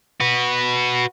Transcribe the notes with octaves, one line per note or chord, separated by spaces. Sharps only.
F#4 B4